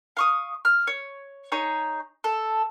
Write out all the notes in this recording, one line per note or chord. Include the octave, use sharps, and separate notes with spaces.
F5 C#6 D#6
F6
C#5
D#4 G#4 C#5
A4